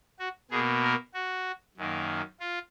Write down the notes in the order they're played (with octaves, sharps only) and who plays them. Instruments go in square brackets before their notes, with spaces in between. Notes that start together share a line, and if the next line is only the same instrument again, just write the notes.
[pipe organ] F#4
B2 A#3 G#4
A#4
F#4
F#2 D#3 A#3
F4